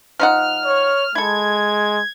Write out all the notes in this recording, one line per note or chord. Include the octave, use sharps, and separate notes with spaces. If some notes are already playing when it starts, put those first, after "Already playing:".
F3 D#4 F#5 F6
C#5
G#3 E4 A4 G#6